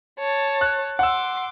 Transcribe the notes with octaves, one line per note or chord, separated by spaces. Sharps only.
C#5 A5
F#6
F#5 C6 D6 E6